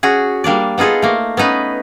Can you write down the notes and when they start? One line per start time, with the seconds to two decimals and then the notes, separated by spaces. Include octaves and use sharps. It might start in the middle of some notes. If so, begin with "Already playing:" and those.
0.03 C#4 F#4 G#4
0.44 G3 A#3 D4 D5
0.78 B3 D#4 F4 G#4 A4
1.02 A3 A#3
1.37 B3 C#4 D#4 B4